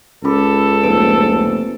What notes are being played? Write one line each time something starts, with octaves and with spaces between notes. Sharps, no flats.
C#2 C#4 A4 B5 D6
F1 A#3 B4 D7